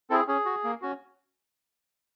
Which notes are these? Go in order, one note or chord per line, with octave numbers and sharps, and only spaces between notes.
C4 E4 G#4 A4
C#4 G#4
F#4
A#3
C#4 F#4